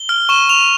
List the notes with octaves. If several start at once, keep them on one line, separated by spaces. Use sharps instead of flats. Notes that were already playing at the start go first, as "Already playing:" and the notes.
Already playing: G7
F6
C#6 E7
C#6 F7